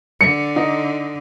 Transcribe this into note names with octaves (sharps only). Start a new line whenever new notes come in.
D3 C#7
D#4